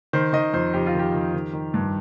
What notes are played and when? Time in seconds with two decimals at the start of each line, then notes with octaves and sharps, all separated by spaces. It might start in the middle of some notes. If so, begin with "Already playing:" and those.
0.13 D#3 C5
0.33 D#3 D#5
0.54 F2 C5
0.73 F2 G4
0.87 F4
0.94 D#3 G4
1.14 D#3
1.34 D#3
1.53 D#3
1.74 G2